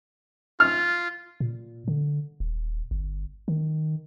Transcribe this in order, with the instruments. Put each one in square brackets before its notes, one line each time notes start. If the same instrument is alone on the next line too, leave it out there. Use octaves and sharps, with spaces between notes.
[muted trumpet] F4 [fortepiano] F6
[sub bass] A#2
D3
D#1
G1
D#3